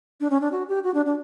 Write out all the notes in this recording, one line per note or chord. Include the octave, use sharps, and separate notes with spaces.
D4
C#4
D4
F#4
G4
F#4
D4
D4